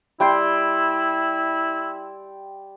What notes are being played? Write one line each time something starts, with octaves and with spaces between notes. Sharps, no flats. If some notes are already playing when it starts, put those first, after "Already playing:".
G3 E4 G5 C6